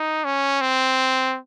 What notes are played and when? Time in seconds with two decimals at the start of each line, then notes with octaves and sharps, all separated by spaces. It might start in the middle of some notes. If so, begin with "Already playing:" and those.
Already playing: D#4
0.24 C#4
0.61 C4